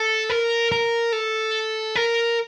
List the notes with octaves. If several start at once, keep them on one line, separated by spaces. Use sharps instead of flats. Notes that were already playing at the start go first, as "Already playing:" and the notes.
Already playing: A4
A#4
A#4
A4
A#4